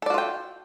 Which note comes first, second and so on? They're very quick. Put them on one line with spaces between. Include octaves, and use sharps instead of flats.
A4 D5 F#4 F4 G5